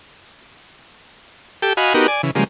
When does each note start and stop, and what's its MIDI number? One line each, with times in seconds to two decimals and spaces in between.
1.62 1.73 67
1.62 1.73 69
1.62 1.73 79
1.77 1.94 66
1.77 1.94 75
1.77 1.94 77
1.77 1.94 80
1.77 1.94 83
1.94 2.07 59
1.94 2.07 63
1.94 2.07 66
1.94 2.07 67
1.94 2.07 70
2.08 2.22 74
2.08 2.22 80
2.23 2.31 49
2.23 2.31 52
2.35 2.44 49
2.35 2.44 53
2.35 2.44 55
2.35 2.44 56
2.35 2.44 58